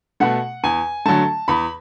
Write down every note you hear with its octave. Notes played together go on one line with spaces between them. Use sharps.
B2 A3 F#5
E2 G#5
D3 F#3 A3 A5
E2 B5